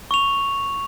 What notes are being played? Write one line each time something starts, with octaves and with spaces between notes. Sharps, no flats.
C#6 F7